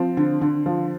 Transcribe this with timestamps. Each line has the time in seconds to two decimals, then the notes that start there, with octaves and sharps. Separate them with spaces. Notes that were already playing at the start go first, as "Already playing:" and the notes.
Already playing: F3 C4
0.17 D3
0.41 D3
0.66 F3